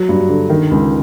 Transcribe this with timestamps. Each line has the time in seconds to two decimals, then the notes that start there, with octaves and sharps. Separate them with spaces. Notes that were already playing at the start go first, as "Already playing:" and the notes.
Already playing: F#3
0.09 G2
0.29 D3
0.50 D#3
0.71 C#2